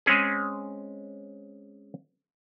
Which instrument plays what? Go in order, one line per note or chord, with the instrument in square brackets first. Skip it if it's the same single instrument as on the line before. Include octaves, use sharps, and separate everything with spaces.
[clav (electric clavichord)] G#3 C4 C#4 G#4